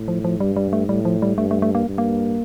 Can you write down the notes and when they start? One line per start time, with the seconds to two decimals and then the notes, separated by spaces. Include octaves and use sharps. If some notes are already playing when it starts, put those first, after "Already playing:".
Already playing: A2
0.08 F3
0.24 F3
0.40 G2 G3
0.56 G3
0.73 A3
0.89 A2 G3
1.05 F3
1.22 G3
1.38 G2 A3
1.51 A3
1.62 A3
1.75 A#3
1.87 G2
1.98 A#3